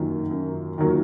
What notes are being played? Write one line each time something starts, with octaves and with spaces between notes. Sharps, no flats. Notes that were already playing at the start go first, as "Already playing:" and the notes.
Already playing: F#2 D#3 F#3 A#3
F#2
D#3 F#3 A#3